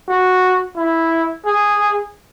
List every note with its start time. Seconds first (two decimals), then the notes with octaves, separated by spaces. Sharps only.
0.08 F#4
0.77 E4
1.46 G#4